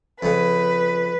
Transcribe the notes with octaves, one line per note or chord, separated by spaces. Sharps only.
F2 C#3 B4